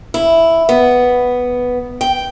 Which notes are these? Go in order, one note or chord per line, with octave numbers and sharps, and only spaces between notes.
E4
B3
G5